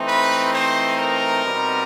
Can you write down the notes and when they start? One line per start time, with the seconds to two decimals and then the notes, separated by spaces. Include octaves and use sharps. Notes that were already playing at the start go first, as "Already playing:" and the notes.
Already playing: E3 A3 C4 D#4
0.08 B4
0.54 C5
0.99 A#4
1.45 B2 G3 C4 D#4